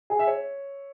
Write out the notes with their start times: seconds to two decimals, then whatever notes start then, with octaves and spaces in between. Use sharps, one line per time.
0.10 G#4
0.19 E5
0.27 C#5